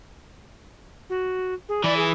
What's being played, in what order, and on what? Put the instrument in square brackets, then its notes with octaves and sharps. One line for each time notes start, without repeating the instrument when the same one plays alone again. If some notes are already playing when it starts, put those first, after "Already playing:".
[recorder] F#4
G#4
[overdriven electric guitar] E3 E4 [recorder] D5
[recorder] G#4